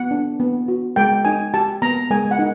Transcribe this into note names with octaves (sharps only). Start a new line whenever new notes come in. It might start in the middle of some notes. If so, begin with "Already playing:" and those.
Already playing: B3 F#5
D4
B3
F#4
G#3 G5
D#4 G#5
G4 A5
B3 A#5
G#3 G#5
F#5
D#4